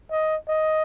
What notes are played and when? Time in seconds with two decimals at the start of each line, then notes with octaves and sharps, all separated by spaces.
0.11 D#5
0.48 D#5